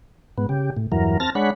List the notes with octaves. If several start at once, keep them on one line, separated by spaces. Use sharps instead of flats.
G#2 B3
C#3 G4
A2
E2 G2 E3 F#3 A#4
C4 A5 F6 A6 A#6
G#3 D4 C#5 F#5 B5